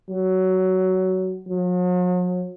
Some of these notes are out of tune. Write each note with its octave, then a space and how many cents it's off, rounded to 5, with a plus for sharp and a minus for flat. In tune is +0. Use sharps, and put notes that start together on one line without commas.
F#3 +15
F#3 -45